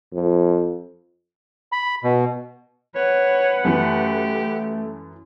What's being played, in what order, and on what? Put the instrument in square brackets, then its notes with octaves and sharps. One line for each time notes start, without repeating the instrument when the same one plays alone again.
[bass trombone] F2
[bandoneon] B5
B2
[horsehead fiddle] B4 F#5 [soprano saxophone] C#5
[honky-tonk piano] F#2 E3 [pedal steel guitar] A3 [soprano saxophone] G4